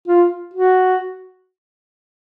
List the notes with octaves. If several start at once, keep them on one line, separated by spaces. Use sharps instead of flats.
F4
F#4